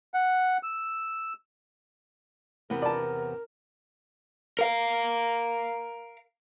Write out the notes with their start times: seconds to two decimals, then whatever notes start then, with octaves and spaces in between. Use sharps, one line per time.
0.14 F#5
0.63 E6
2.70 E2 C3 B3 A#4
2.82 D5 A5
4.59 A#4 F5